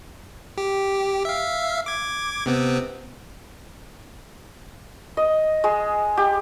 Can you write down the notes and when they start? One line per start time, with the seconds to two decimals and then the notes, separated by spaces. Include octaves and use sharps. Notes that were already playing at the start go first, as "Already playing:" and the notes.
0.57 G4
1.25 E5 F5
1.86 D6 G#6
2.46 C3 B3 C4
5.17 D#5
5.64 G#3
6.17 G4